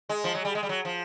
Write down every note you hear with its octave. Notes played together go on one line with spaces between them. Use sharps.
G#3
F3
F#3
G3
G#3
G3
F#3
F3